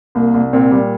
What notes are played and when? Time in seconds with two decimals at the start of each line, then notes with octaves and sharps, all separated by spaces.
0.15 C2 A#3
0.34 C2
0.53 A#2 C4
0.72 G3